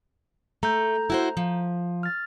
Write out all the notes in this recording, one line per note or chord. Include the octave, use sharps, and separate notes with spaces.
A3 A#5 G6
E4 F#4 C5
F3
F6 A6